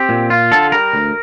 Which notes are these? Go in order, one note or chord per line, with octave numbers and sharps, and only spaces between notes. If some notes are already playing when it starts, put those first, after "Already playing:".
Already playing: C4 G4
A#2
F4
D3 A4
G3 A#4
D2